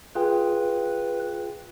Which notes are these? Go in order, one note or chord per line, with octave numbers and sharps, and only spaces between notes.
F4 G#4 B4 G5